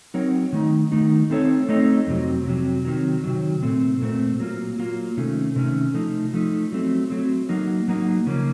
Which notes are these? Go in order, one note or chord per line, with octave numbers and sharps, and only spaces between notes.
F#3 C4 D#4 A#4 C#5
D#3 A3 D#4
D#3 A3 D#4
A3 C4 D#4 A4 C#5
A3 C4 D#4 A4 C#5
F2 C3 F#3
F2 C3 F#3
C3 D#3 F#3
C3 D#3 F#3
A#2 A3 C4
A#2 A3 C4
F#3 A#3 F4
F#3 A#3 F4
C3 D#3 A3 C#4
C3 D#3 A3 C#4
F3 A3 D#4
F3 A3 D#4
F#3 A3 C4
F#3 A3 C4
F#3 A#3 D#4
F#3 A#3 D#4
C#3 F3 A#3 C#4